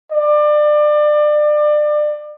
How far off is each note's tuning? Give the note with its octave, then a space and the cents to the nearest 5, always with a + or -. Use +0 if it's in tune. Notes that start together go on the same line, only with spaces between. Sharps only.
D5 +30